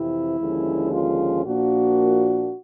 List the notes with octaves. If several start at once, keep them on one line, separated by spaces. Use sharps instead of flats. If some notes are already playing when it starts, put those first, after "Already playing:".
Already playing: F2 C3 E3 E4
D#2 D3 F3 G#3 C#4
F4
A#2 F3 A#3 D4 F#4